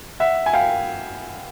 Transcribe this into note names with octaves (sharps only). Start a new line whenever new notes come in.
E5 F#5
G#5
F5 G5